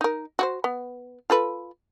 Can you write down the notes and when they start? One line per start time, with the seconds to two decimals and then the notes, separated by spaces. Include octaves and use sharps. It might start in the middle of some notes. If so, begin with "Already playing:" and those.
0.01 D#4 A#4
0.39 F#4 G4 C5
0.64 B3
1.30 F4 A4 B4